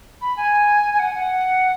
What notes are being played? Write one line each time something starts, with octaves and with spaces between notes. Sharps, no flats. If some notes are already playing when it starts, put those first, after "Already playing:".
B5
G#5
G#5
F#5
F#5